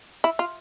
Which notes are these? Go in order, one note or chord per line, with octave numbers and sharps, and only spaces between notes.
E4
F4